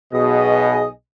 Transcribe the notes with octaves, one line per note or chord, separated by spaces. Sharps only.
B1 B2 G#4 D#5